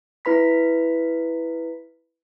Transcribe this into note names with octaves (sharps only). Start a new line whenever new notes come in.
E4 B4 B5 B6